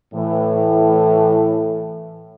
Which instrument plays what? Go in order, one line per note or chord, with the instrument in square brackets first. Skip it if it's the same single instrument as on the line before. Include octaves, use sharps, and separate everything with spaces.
[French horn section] A2 E3